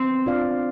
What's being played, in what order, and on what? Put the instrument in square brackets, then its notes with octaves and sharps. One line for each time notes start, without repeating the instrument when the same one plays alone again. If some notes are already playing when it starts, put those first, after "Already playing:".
Already playing: [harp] C4
[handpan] D4 F4 D5 F5